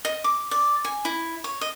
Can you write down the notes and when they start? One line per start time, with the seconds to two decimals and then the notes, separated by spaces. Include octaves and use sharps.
0.05 D#5
0.24 D6
0.51 D5
0.85 G#5
1.05 E4
1.44 C#5
1.61 D#5